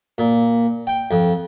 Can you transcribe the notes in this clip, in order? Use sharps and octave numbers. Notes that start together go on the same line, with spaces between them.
A#2
G5
F2